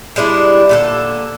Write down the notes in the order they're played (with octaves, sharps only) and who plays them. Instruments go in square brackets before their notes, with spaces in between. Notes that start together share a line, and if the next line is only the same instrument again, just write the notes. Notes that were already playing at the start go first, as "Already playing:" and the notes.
[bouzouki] G3 G#3 D4 E4
A#2 D3 A4